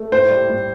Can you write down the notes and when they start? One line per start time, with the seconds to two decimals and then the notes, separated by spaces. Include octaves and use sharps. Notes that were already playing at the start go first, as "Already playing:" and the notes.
Already playing: A3
0.12 A2 C5
0.30 G3
0.49 A2